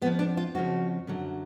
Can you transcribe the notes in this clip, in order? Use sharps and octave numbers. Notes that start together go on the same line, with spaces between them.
F2 F3 B3
D4
F4
F2 C#3 F3 F#4
F#2 D3 F#3